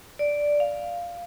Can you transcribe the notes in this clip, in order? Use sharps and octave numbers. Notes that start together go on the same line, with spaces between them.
D5
F5